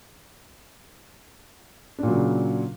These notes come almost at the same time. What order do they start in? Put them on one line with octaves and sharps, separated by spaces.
D4 A#2 F#3 C#3